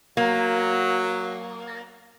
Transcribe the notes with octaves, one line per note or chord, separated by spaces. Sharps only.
F#3 A#3